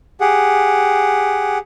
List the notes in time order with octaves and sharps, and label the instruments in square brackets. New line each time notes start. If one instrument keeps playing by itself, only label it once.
[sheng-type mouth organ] G4 G#4 F#5